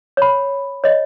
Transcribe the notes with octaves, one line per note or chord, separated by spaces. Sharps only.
C#5 B5
C#5 D#5